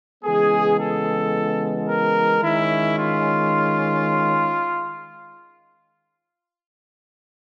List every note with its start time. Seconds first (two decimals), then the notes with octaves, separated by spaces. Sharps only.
0.24 C#3 E3 G#3 B3 G#4
0.79 A4
1.88 A#4
2.42 D#3 G#3 C#4 E4
2.97 F4